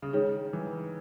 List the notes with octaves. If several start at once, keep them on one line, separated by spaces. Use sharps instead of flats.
C#3
D#3 G#3 D#4 G#4 C#5
E3